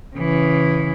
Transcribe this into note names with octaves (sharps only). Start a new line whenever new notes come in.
C#3 E3